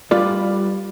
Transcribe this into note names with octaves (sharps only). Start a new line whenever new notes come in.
G3 F4 B4 D5